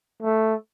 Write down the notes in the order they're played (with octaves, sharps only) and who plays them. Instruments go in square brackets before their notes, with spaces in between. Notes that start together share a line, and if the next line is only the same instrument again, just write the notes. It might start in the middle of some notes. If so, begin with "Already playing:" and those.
[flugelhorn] A3